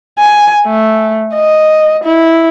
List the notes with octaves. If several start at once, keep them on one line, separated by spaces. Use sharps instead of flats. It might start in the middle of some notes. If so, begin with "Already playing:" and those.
G#5
A3
D#5
E4